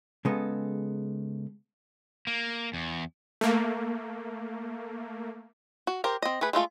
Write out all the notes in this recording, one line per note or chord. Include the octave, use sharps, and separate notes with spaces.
C#3 G#3 B3 A4
A#3
E2
A3 A#3
F#4
G4 A#4 C5
C4 D#5
A3 G#4 B4
G#3 A3 F4 A4